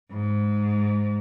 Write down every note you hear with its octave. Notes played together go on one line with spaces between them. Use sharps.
G#2